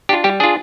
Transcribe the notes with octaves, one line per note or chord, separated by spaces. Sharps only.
D4 F4 G4
G3 G4
D4 F4 G#4